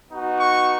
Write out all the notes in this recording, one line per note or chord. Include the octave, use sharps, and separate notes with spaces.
B3 D#4 F#4
C#6